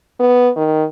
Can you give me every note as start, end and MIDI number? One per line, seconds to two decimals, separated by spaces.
0.20 0.49 59
0.56 0.84 51